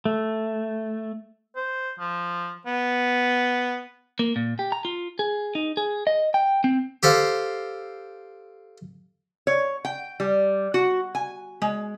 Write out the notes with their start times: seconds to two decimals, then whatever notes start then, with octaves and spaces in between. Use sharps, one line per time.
0.05 A3
1.56 C5
1.99 F3
2.66 B3
4.19 A#3
4.36 A#2
4.59 G4
4.72 A#5
4.85 F4
5.19 G#4
5.55 D#4
5.77 G#4
6.07 D#5
6.34 G5
6.64 C4
7.03 G4 A4 C5 F5
9.47 C#5
9.85 G5
10.20 G3
10.74 F#4
11.15 G#5
11.62 G#3